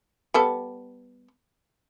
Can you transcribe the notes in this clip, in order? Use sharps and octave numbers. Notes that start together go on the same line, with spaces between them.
G3 B3 A4